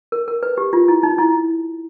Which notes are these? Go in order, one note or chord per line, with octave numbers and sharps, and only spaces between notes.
A#4
A#4
B4
G4
F4
E4
D#4
E4